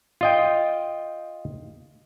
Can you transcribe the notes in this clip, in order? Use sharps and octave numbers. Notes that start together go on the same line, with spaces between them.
F4 D#5 G5